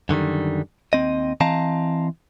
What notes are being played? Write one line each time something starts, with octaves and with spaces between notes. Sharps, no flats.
F#2 D3 D#3 G3
D#2 C4 D#5
E3 C4 D#5 F5 A5 A#5